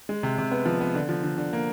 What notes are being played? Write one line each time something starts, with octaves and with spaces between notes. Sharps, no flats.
G#3
C3
C3
B3
F3
B3
D3
F3
D3
D3
A#3